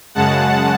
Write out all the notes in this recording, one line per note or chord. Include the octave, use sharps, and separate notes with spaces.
F#2 C#3 G#3 F#5 A5